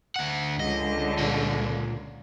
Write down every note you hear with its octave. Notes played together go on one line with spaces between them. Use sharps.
D2 F#5
C#2 D3 D#5
A#2 D#5